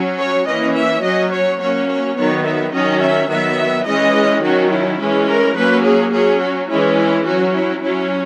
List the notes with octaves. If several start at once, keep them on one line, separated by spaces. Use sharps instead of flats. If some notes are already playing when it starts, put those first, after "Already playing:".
Already playing: F#3 C#4
C#5
E3 A#3 C#4 D#5
E5
F#3 C#4 D#5
C#5
F#3 A#3 C#4 C#5
C#5
D#3 F#3 B3 C#5
E5
D#3 F#3 C#4 D#5
E5
D#3 F#3 B3 E5
E3 G#3 C#4 D#5
D#3 F#3 C#4 F#4
E4
E3 G#3 C#4
A#4
F#3 A#3 C#4 B4
G#4
F#3 C#4 G#4
F#4
E3 G#3 C#4 E4
E4
F#3 C#4 F#4
E4
F#3 C#4 E4